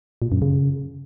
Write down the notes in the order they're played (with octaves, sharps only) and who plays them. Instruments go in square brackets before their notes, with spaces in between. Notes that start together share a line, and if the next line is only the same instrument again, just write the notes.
[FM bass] A#2
F#2
C#3